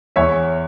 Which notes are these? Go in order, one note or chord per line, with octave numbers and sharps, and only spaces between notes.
E2 C#5 E5